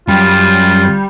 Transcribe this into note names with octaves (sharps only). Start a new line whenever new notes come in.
F#2 G3 F4